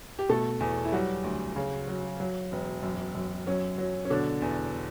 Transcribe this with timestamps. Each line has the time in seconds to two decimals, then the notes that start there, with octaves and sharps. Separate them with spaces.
0.19 G4
0.29 B2 A3 A4
0.60 E2
0.85 E4
0.92 F#3 G3 F#4
1.24 D2
1.56 C#3
1.87 F#3
2.20 F#3
2.52 E1
2.83 F#2
3.15 F#2
3.47 F#3 C#4
3.78 F#3
4.05 C#4
4.10 B2 D3 D4
4.42 E2